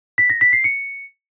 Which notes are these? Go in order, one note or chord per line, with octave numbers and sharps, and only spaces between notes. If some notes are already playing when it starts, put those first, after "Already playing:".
B6
A#6
B6
C7
C#7